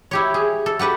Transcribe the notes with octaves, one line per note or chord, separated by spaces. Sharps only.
E4 G4 C#5
G#4
A4
F#4 G4 B4 F#5